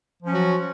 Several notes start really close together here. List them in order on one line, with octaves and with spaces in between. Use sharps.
F3 C#4 F#3 F#4